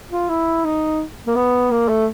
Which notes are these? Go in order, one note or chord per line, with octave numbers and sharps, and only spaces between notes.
F4
E4
D#4
A#3
B3
A#3
A3